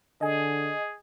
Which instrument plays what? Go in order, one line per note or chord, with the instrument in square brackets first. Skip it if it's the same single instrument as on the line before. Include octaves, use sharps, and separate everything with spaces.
[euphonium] D3 [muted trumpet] G#4 [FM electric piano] D#5 G#5